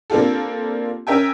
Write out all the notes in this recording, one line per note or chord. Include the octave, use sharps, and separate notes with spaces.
A#3 C4 D4 F4 G4 A4
C#4 A#4 E5 G5 G#5